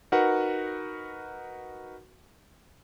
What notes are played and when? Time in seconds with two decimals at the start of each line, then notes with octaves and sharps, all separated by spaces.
0.12 D#4 F#4 A#4 B4 F#5